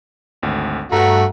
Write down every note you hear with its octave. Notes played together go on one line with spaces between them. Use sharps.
G#1 D2
G2 A3 F#4 F#5 A#5